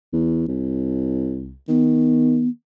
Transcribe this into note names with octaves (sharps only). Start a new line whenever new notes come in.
E2
C2
D#3 B3